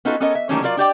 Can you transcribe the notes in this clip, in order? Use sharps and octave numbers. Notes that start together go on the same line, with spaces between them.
B3 C#4 D#4 F4 F#4 A4
B3 C#4 A4 A#4 C#5 D#5
E5
D#3 E3 G3 A3 A#3 C#4
F#3 F4 A#4 D5 F5
D4 G4 D5 G5